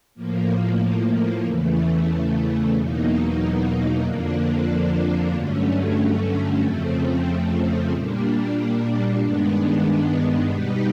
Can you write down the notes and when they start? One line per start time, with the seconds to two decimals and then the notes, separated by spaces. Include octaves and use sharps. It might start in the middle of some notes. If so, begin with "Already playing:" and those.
0.15 A2 F3 A#3
1.44 E2 C#3 E3 A3
2.74 E2 B2 F#3 A#3 D#4
4.03 F2 D3 F3 A#3 D4
5.32 G2 D3 F#3 A3 C#4
6.61 F2 C#3 F3 A3 C4
7.91 A#2 G3 A#3 D4
9.20 G2 D#3 G#3 B3 D4
10.50 B2 G3 B3 D#4 G4